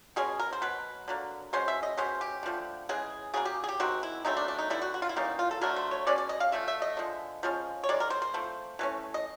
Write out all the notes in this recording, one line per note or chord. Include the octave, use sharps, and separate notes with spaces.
B2 G#3 C#4 G#4
A#4
C5
B2 F#3 B4
D3 F#3 A#3
B2 G#3 C#4 C5
E5
D#5
B2 G#3 C#4 C5
G4
D3 F3 A3
C#3 E3 G#3 G#4
C#3 F#3 A#3 G#4
G4
G#4
G4
C3 D#3 G#3 C4 F#4
E4
C#3 F#3 A3 C4 D#4
D4
D4
D#4
D3 G3 B3 E4
F#4
F#4
F4
E4
E3 G3 A#3 C#4 D#4
F4
A4
D3 F#3 A3 A#4
C5
C#5
B2 G#3 C#4 D5
D5
D#5
F5
F3 A3 E5
E5
D#5
D3 F3 G#3
F3 G#3 C#4
C#5
D#3 G#3 D5
A#4
C5
C5
F3 A3 C4
E3 A3 C#4
D#5